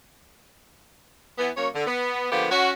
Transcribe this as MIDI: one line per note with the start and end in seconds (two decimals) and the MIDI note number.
1.38 1.50 52
1.38 1.50 59
1.56 1.69 42
1.56 1.69 58
1.56 1.69 73
1.74 1.85 50
1.86 2.30 59
2.31 2.47 50
2.31 2.47 53
2.31 2.47 58
2.31 2.47 59
2.31 2.47 67
2.50 2.71 61
2.50 2.71 66